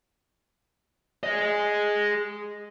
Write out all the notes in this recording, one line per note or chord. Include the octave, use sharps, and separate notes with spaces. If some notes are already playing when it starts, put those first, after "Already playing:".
G#4 D#5